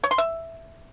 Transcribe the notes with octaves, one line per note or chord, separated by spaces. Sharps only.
C#5
C6
E5